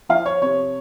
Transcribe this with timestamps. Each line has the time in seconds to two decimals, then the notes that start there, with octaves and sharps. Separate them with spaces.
0.09 F3 F5
0.26 C#5
0.42 C3 C#5